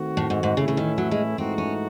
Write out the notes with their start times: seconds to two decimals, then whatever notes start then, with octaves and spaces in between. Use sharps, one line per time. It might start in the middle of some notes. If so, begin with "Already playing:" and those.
Already playing: D#3 A3 C4 F#4
0.17 A2
0.30 G#2
0.43 G#2
0.57 A2 C#3 E3 A3 C#4 E4
0.68 C#3
0.77 D#3
0.98 F#3
1.11 G#3
1.38 G#2 E3 A3 C4 D#4 F#4
1.58 C#4